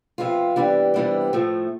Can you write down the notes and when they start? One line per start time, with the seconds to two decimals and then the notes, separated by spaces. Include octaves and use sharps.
0.18 C3 F3 B3 F4
0.56 C3 E3 G3 B3 D4
0.94 C3 E3 G3 B3 D4
1.33 A2 F3 A3